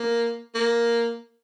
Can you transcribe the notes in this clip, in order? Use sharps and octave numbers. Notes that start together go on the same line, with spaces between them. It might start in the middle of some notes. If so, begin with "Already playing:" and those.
Already playing: A#3
A#3